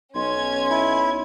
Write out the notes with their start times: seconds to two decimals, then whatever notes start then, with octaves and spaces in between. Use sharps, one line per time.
0.15 B1 C#4 C6 G#6
0.71 E4